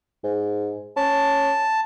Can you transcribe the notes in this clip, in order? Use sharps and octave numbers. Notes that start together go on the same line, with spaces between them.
G#2
C#4 A5